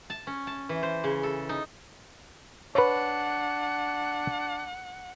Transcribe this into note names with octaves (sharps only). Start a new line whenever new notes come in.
A5
C#4
A5
E3
C5
C#3
A4
D#4
D4 B4 C#5 F#5